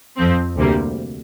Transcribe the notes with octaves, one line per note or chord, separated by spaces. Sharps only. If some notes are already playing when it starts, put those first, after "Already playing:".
F2 F3 C4
D2 C3 G3 A#3